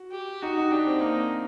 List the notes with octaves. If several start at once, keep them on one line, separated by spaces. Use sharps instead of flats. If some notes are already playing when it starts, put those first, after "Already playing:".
Already playing: F#4
G4
D#4 F#4
D#4
D4 G4
C4
A#3 D#4